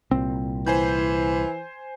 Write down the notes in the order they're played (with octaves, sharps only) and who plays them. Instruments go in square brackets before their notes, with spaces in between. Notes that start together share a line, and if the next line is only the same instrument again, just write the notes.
[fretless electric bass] C2 A#2 [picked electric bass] C4
[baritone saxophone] E3 [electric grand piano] C5 G#5 G6